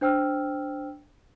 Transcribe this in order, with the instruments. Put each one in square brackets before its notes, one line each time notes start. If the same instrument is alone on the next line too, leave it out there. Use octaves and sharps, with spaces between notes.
[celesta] D4 C5 G5 E6 F6